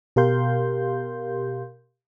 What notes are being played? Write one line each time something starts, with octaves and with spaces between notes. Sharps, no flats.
B2 G4 A#4 F5 C6 G6